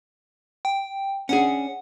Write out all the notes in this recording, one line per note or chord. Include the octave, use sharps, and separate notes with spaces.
G5
C#4 D4 G#4 F#5